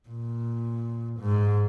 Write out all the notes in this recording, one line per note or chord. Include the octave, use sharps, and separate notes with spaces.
A#2
G#2